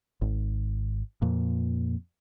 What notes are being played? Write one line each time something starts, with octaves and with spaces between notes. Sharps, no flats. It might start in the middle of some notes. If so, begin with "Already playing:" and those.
G#1
F2 A#2